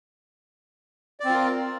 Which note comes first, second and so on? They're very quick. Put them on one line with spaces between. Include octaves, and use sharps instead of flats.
D5 C4 F4 A#4